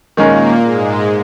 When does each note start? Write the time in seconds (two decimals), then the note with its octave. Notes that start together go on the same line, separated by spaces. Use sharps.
0.17 A#2 D#3 G#3 A#3 C#4 A#4
0.63 G#2 G#3